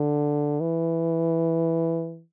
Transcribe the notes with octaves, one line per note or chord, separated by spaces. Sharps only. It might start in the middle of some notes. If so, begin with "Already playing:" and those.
Already playing: D3
E3